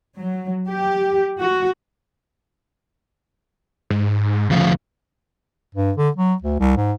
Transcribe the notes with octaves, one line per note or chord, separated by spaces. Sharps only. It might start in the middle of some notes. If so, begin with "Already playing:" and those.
F#3
G4
F#4
G#2
D2 C#3 F3
G2
D3
F#3
D2
C2
G#2